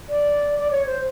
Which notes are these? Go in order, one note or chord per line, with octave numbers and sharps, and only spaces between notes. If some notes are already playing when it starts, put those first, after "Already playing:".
D5
D5
C#5
C5